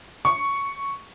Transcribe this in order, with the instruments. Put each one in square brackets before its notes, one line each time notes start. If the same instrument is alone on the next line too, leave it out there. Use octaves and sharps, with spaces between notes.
[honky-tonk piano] C#6